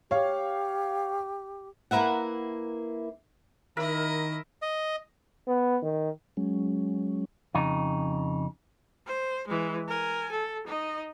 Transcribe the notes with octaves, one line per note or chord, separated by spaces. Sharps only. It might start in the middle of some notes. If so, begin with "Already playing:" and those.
G4 C#5 F5
A#3 E4 A#4 B4 E5 F#5
D#3 E4 A#4 D#5 E5
D#5
B3
D#3
F#3 G#3 C#4
F2 C#3 D#4
C5
E3 G#3
A#4 G#5
A4
D#4 D#5